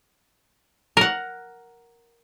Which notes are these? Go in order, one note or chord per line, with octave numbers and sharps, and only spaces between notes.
A#4 F#5